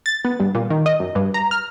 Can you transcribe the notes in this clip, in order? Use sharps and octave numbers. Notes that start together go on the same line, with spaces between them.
A6
B3
G2
A#2
D#3
D#5
F#2
G2
A#5
F6